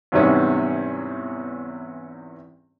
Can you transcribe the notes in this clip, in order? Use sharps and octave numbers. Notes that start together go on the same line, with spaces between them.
E2 G#2 C3 G3 B3 C#4